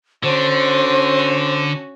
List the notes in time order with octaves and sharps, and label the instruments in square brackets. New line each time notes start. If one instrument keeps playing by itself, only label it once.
[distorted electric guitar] D3 [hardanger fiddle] C#4 F#4 [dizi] C5